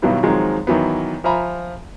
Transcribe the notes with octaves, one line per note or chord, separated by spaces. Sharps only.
G2 B2 D#3 F#3 G3 E4
D#3 F3 F#3 G#3 C4 D#4
D#3 E3 F#3 B3
F3 E5 G#5 A#5 B5